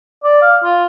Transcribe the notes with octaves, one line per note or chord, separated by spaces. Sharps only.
D5
F5
F4